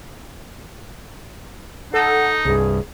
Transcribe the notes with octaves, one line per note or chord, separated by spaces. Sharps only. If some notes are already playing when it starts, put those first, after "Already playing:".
D#4 A4 F#5
C2 G2 G#4